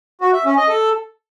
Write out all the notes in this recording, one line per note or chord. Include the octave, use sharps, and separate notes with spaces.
F#4
E5
C#4
D#5
A4